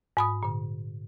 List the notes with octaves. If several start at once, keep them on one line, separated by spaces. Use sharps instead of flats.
G#2 B5 D#6
A#2 D3